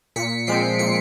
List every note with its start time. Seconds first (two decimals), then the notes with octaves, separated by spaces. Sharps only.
0.16 A#2 B6 C#7
0.47 F3 G#3 C4 C7 D7
0.79 A#2 C#7